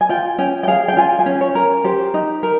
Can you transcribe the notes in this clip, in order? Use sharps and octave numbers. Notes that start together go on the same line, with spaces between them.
G#5
F4 G5
C#4 G5
G5
G#4 F5
G5
F4 G#5
G#5
C#4
C#5
A#4
G4 C5
D#4
A#4